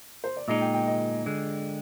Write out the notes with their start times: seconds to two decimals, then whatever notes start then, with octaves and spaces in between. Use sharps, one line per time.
0.24 C5
0.37 D5
0.48 A#2 G#3 D#4 D#5
0.61 G5
0.74 G5
0.87 D#5
1.26 D3 G#3